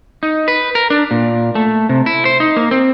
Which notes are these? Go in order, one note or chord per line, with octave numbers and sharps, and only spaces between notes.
D#4
B4
A#4
D4
A#2
A3
C3
E4
C5
D#4
A#3
C4